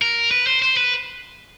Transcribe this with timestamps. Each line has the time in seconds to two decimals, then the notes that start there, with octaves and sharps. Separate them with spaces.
0.02 A#4
0.31 B4
0.47 C5
0.62 C5
0.77 B4